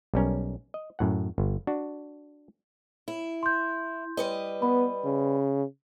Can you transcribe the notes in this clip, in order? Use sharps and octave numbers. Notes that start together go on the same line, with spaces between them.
B1 G3 C#4 A#4
D#5
F#2 A2 F#5
G1
D4 F#4
E4
C6 G6
G3 B4 D#5
B3 B5
C#3